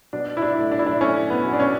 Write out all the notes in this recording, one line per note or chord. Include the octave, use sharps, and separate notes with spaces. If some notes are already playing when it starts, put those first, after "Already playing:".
B2 D4
E4
D4
A3
D4
E4
D4
A3 C#4
B3
B2
D4
C#4